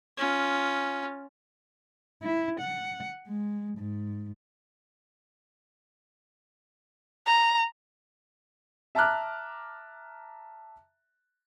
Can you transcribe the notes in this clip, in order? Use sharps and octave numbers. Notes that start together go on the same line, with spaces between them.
C#4 F4
E4
F#5
G#3
G#2
A#5
E5 A5 A#5 D6 F6 F#6